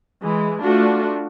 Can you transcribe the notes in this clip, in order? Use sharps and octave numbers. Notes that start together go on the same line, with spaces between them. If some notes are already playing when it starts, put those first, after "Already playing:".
E3 G#3
A3 D4 F4 F#4